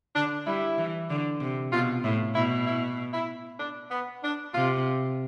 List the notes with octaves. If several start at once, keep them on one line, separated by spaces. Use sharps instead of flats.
D3 D4
G3 E4
E3
D3
C3
B2 F4
A2 E4
B2 E4
E4
E4
D4
B3
D4
C3 F4